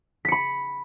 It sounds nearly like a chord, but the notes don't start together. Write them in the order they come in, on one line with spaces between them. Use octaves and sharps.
B6 C#7 B5